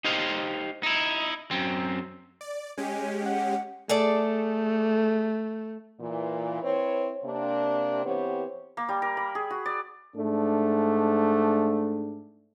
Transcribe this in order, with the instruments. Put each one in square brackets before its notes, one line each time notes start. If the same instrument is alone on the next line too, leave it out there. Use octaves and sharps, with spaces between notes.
[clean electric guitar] D#4 G4 C5 D#5 F5
D#4 E4
F#2 C4
[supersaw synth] D5
[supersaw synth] G#3 C#4 G4 [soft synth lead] G#5
[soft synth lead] F#5
[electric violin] A3 [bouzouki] G#4 A4 D5
[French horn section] A#2 E3
C4 E4 B4 C#5
C3 A#3 D4
E3 B3 C4 G4 C5 C#5
[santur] A#3
G3
A#4
B5
G#4
F#4
D5
[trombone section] G#2 A3 D4